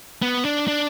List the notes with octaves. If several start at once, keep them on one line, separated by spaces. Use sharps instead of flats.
B3
D4
D4